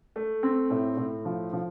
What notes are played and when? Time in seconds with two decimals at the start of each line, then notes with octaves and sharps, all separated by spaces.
0.16 A3
0.43 C4
0.70 A2
0.97 A2
1.25 F3
1.53 F3